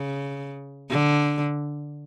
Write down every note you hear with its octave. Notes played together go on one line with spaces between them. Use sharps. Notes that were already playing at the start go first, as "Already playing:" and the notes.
Already playing: C#3
D3